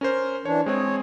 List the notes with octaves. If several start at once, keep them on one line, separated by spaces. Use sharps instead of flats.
C#4 A#4 C5
E3 D4 C#5
G#3 C4 G#4 C#5